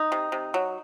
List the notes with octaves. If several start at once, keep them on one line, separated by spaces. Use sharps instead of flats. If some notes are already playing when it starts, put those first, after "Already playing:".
Already playing: D#4
C3
C3
F#3